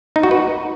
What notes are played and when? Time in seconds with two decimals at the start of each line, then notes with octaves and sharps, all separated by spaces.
0.16 D#4
0.23 F#4
0.31 B4